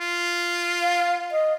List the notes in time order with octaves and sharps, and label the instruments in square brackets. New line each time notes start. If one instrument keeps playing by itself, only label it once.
[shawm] F4
[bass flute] F5
D#5